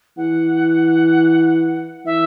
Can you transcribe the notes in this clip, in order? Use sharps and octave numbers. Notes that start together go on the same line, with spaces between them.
E3 F#5
E3 E5